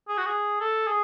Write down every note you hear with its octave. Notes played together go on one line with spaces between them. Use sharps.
G#4
F#4
G#4
A4
G#4